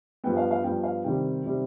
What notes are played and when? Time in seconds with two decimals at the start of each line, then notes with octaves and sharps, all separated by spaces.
0.24 G2 F3 B3 G5
0.37 F5
0.51 F5
0.64 G2 F3 B3 G5
0.84 F5
1.04 C3 D#3 G3 C4 G5
1.45 C3 D#3 G3 C4